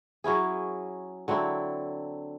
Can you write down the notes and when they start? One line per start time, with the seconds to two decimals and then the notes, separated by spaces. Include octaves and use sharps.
0.24 F#3 C#4 E4 G#4
1.28 D3 F#3 C4 E4